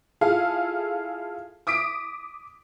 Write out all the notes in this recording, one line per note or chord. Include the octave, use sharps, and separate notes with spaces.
E4 F4 G#4 A4 F5
D6 D#6 B6 D7